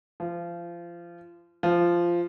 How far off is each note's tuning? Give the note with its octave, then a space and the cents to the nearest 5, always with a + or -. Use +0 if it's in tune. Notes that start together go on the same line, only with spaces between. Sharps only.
F3 -25
F3 -10